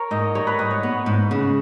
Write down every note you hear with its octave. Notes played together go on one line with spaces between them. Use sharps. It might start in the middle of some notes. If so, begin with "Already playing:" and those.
Already playing: A#4 C#5
G#2 D#5
G3 C#5
B4
G#2 D#5
C#5
B3
G#2
C#3